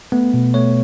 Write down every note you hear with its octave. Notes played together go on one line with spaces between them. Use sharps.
A3 B3
B2
A3 C#5